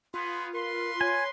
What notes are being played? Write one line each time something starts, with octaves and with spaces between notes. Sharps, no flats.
B3 F4 G#4 B4 C6
A#4 B4 C6
C#5 G#5